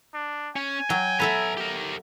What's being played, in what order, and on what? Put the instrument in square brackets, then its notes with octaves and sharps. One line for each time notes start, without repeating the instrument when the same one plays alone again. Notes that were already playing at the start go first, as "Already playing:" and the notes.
[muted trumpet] D4
[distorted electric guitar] C#4 [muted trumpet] G#5
[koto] F#3 [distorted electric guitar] G5
[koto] B3 A4 E5 [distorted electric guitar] B4 A#5
[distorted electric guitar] G4 A#4